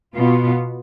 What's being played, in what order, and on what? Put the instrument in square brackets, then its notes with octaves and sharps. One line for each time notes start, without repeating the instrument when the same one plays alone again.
[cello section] B2 B3 F4